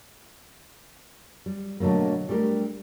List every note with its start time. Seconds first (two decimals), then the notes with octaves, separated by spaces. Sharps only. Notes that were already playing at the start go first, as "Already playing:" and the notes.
1.46 G3
1.80 B2 D3 F#3 A3 A#3
2.28 G3 A3 D4 G4 A#4